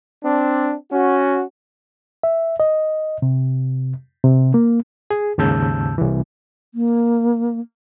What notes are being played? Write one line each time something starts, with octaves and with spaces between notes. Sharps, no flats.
C4 D4
C#4 F#4
E5
D#5
C3
C3
A#3
G#4
D#2 G#2 C#3 A5 E6 G6
C2 E3
A#3